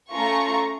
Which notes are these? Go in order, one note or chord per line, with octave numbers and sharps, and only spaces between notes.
A3 C#4 F4 A4 A#5 C#6